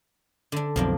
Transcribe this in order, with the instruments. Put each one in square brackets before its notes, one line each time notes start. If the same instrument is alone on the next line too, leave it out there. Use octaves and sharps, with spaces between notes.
[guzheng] D3 D4
[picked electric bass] B1 F2 [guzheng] F3 A#3 D4